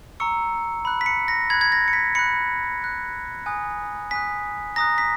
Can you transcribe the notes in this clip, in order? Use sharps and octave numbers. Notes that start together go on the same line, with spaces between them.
A#5 C#6 E6 C#7
B5 F#6
B6
C#7
A#6
B5 F#6 G#6
G#6
A#6
C#7
B6
B5 F#6 C#7
B5 F#6
G#5 D#6 F#6
G#5 D#6 F#6 B6
A#5 D#6 F#6 A#6
B6